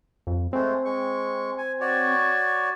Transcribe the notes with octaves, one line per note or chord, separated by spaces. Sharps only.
F2
G#3 A3 C4
G#3 C#6
G#5
F#4 C#5 D5